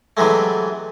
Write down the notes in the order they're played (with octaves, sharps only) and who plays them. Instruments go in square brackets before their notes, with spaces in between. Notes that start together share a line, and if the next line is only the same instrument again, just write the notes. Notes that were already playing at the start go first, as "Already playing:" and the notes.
[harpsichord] C3 E3 F#3 G#3 A3